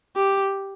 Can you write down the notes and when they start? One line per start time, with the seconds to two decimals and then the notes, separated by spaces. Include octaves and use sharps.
0.17 G4